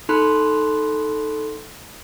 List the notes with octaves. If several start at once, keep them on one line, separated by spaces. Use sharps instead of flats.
D#4 A4 B5 C6 F#6